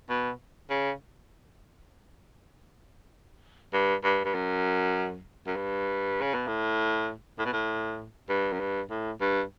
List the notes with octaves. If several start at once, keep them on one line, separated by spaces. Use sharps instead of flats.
B2
C#3
G2
G2
G2
F#2
F#2
G2
C#3
B2
A2
A2
B2
A2
G2
F#2
G2
A2
G2